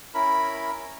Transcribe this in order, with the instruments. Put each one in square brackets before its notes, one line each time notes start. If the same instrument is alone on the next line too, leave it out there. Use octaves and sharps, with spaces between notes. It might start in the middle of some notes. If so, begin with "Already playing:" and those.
[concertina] C#4 E4 A#4 B5